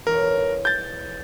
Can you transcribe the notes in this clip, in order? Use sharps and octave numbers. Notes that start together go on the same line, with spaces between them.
E1 B1 A#4 C#5
G6 A6